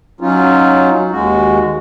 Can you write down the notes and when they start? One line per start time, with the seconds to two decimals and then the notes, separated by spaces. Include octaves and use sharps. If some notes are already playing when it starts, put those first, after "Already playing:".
0.21 F#3 C#4 D#4 F4
1.11 D#2 G#3 F#4